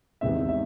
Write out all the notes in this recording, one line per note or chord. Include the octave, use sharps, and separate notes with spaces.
E2 C3 D#3 G#3 C4 E5
E5